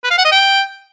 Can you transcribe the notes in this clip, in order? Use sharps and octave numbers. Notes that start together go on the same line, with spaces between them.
B4
F5
F#5
D#5
G5